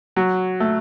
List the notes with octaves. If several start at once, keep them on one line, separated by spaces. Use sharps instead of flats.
F#3
A3